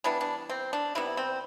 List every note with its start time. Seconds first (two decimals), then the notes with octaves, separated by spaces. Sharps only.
0.04 E3 G3 B3 D4
0.21 D4
0.49 C4
0.73 D4
0.95 C3 G3 B3 E4
1.17 C4